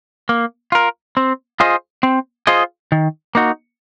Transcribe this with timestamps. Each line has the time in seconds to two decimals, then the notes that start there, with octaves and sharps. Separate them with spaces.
0.29 A#3
0.72 F4 A#4
1.17 C4
1.60 F4 G#4 C5 D#5
2.03 C4
2.47 F4 G#4 C5 D#5
2.92 D#3
3.35 A#3 D#4 F#4